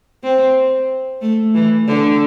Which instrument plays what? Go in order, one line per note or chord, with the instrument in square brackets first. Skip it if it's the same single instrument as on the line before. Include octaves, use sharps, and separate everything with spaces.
[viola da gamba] C4
A3
E3
D3